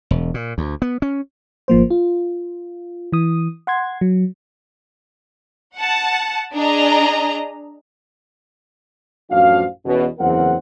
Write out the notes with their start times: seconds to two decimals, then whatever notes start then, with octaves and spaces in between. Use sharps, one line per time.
0.11 E1
0.34 A#2
0.58 D2
0.82 B3
1.02 C#4
1.68 G#1 F3 A#3 C5
1.90 F4
3.12 E3 D#6
3.67 F#5 C6 G#6
4.01 F#3
5.76 F#5 A5
6.54 D4 G#4 D#5 A#5
9.30 A1 F#2 F3 D4 F#4 F5
9.85 E2 B2 C#4
10.19 F#1 E2 C4 A#4 F#5